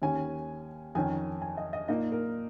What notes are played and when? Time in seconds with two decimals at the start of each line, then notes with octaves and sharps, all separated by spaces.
0.02 D#2 D#3 C#4 G#5
0.95 F2 D#3 C#4 G#5
1.42 G#5
1.57 D#5
1.73 D#5
1.88 A#2 A#3 D#4 D#5
2.12 A#4